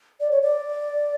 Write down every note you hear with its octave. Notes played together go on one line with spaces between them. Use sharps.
D5
C#5
D5